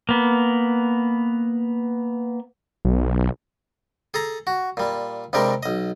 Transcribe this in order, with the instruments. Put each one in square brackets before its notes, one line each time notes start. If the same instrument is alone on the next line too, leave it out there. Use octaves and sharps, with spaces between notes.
[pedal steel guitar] A#3 B3
[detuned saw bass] B1
[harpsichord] G#4 A4 A#5
F#4
A#2 G3
G2 C3 G3 G#3 G4 A#4
B1 D#5